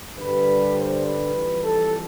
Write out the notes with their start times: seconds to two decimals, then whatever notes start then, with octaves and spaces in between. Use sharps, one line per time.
0.16 G2 D3 G3 B4
0.76 C5
1.04 B4
1.33 F2 E3 G3
1.62 A4